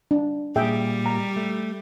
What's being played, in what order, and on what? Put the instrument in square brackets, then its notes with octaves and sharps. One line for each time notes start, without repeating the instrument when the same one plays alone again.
[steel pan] D4
[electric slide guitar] A#2 [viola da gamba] G3 [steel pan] G#4 E5 G5
[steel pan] A#5
[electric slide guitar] A3